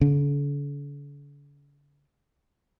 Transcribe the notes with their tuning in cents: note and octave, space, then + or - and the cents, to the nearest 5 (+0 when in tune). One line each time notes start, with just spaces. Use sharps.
D3 -45